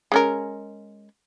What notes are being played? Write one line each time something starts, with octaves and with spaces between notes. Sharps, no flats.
G#3 C#4 A#4